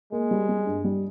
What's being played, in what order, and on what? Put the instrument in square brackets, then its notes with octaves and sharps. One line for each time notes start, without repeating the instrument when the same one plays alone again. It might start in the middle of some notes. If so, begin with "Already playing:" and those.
[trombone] G#3 [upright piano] A#3
[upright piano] G3
G3
G2
G3